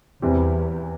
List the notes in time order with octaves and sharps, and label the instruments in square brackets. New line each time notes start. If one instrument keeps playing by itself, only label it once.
[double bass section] E2 [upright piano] C3 E3 G3 C4 G4